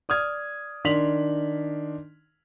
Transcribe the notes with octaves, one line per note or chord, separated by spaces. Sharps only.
D5 D#6 F6 G#6
D#3 D4 C6 B6 F7 F#7